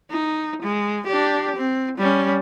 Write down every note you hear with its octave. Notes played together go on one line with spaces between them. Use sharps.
D#4
G#3
D4 G4
C4
G3 C#4